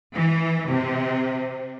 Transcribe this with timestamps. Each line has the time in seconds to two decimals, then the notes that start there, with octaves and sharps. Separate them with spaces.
0.14 E3
0.68 C3